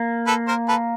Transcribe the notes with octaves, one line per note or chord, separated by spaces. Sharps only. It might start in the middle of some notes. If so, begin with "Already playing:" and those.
Already playing: A#3
A4 B4
A#4 C5
A4 B4